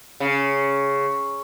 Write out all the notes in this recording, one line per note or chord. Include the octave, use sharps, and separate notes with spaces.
C#3